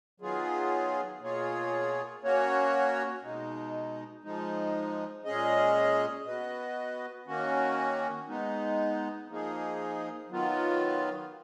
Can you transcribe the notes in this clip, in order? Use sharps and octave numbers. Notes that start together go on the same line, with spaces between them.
D#3 F#3 B3 F4 G#4
B2 A#3 F4 G#4 C#5
A#3 C#4 F#4 C#5
B2 G#3 D#4
F3 G#3 D#4
A#2 G#3 C#4 G#4 D#5
B3 F#4 B4 D#5
D#3 A#3 C#4 F#4
G#3 B3 D#4
F3 A#3 D#4 G#4
D#3 F#3 B3 F4